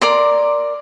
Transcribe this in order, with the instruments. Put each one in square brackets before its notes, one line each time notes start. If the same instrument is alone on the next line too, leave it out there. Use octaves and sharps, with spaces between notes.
[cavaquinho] A#4 D5 C6